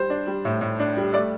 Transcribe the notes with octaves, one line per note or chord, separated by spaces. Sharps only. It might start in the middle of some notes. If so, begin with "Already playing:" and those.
Already playing: G3 C5
D4
G3
A2
A2
D4
G3
A3 D5